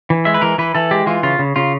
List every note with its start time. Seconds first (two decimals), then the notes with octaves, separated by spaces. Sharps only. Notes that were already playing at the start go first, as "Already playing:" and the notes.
0.10 E3
0.25 G#3 E5
0.34 B4
0.42 E3 A#4
0.58 E3 B4
0.75 E3 A4
0.91 G#3 G4
1.07 E3 F4
1.23 C#3 F4
1.39 C#3
1.56 C#3 F4